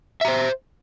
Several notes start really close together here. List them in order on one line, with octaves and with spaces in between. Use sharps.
E5 A#5 C5